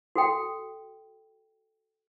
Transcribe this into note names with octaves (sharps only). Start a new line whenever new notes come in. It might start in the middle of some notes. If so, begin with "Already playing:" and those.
F#4 A4 G5